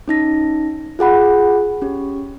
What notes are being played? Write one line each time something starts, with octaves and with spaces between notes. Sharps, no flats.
C#4 D#4 A#6
F4 G#4 F#5 B5
C#4 G4